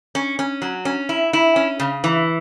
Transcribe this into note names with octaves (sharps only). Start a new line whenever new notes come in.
C#4
C#4
F#3
C#4
E4
E4
C#4
C#3
E3